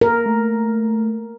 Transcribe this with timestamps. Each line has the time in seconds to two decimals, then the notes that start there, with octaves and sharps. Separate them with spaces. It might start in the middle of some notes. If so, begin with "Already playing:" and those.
0.01 A#4
0.26 A3